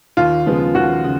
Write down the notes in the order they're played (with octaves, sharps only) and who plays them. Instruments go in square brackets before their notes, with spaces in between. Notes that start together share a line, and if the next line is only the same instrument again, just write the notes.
[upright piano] D#2 [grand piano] F4
[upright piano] C#3 F3 G#3 B3
[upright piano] D#2 [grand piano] F#4
[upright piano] C#3